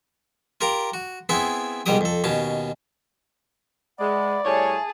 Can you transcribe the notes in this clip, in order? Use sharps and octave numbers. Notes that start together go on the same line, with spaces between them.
F4 G4 A#4 A#5
F#4
B3 C4 E4 G#4 E5 G#5
C2 G#2 B2 G3 G4 D#6
F2 A4
D#2 B2 C#4 A5
G#3 D5 E5 F#5 B5
A2 G3 G#4 C#5 E5 A5